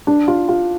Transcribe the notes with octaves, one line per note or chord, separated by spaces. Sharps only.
D4
F4
F4